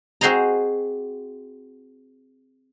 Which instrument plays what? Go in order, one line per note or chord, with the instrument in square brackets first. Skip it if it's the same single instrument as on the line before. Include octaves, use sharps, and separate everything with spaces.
[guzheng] C4 F#4 G#4 C5 D#5 A#5